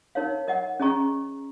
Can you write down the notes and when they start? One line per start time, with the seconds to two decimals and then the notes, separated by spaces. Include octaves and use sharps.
0.15 D#4 A#4 C#5 F5
0.48 A#4 D#5 F#5
0.80 C#4 G#4 D#5 A#5 C#6